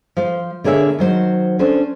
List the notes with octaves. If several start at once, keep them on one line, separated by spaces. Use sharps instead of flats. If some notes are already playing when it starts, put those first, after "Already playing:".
F3 C5
D3 A#3 G#4 C#5 E5
D#3 F#3 C5
C#4 D4 A4 C5